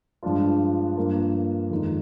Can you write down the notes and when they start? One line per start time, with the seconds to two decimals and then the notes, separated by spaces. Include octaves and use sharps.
0.23 G2 F3 G#3 D4 F4
0.97 G2 F3 A#3
1.70 F2 D#3 G#3 D#4